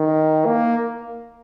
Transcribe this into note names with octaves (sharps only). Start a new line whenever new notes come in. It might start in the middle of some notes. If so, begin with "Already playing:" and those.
Already playing: D#3
A#3